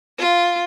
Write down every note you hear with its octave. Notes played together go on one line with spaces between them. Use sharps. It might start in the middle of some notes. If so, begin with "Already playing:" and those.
F4